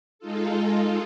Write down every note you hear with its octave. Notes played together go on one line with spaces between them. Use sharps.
G#3 D#4 F4 A4